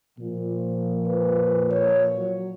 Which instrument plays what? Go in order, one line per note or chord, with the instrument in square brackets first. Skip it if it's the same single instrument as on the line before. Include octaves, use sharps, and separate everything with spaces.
[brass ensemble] A#2 F3
[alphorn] B4
C#5
F#3